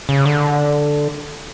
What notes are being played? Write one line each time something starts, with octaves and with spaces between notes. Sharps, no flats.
C#3
D3